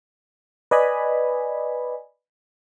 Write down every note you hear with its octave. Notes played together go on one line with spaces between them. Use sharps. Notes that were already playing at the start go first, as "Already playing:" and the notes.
B4 D5 D#5 G#5 B5